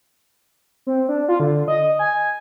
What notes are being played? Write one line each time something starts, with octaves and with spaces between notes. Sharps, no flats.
C4
D4
F4
D3
D#5
G#5